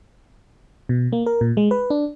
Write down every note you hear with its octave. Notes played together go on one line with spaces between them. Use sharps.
B2
A#3
A#4
A#2
G#3
B4
D4